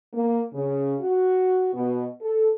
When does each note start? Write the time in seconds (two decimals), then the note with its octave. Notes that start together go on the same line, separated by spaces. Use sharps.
0.13 A#3
0.53 C#3
1.00 F#4
1.73 B2
2.21 A4